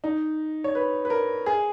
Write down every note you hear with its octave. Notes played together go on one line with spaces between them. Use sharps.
D#4
C#5
B4
B4
A#4
G#4